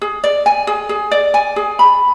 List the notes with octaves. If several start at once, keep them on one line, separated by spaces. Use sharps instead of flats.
G#4
D5
G#5
G#4
G#4
D5
G#5
G#4
B5